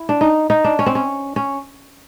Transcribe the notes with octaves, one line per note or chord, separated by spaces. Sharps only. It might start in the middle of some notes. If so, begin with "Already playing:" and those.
Already playing: E4
D4
D#4
D#4
D4
C#4
C4
C#4
C#4